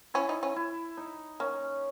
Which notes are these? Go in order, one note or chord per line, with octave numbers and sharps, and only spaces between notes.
C#4 E4
D#4
C#4
E4
D#4
A#3 C#4